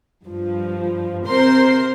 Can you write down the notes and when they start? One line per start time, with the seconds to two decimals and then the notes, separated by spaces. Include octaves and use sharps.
0.25 G2 F3
1.27 C3 A#4 C5 C6